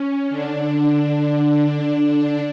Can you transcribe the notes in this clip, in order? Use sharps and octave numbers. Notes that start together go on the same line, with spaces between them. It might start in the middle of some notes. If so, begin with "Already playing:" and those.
Already playing: C#4
D3 D4